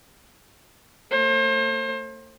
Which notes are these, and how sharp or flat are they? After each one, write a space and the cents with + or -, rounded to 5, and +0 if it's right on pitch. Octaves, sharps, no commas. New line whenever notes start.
A3 +35 C5 +35